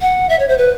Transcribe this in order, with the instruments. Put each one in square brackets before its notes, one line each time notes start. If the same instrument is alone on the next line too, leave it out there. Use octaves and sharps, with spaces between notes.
[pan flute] F#5
E5
C#5
C5
B4